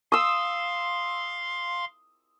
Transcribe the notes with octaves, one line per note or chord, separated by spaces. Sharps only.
F5 C6 D#6 E6